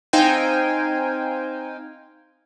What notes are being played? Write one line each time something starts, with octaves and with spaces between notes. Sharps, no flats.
C4 D#4 C5 F5 G5 G#5